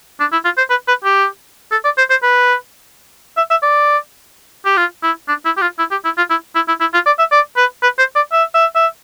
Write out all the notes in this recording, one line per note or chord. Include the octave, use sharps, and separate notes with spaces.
D4
E4
F4
C5
B4
B4
G4
A4
D5
C5
C5
B4
E5
E5
D5
G4
F4
E4
D4
E4
G4
F4
E4
G4
E4
F4
E4
E4
E4
E4
F4
D5
E5
D5
B4
B4
C5
D5
E5
E5
E5